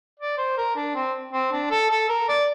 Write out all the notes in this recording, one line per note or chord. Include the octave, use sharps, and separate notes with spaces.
D5
C5
A#4
D4
C4
C4
D4
A4
A4
A#4
D5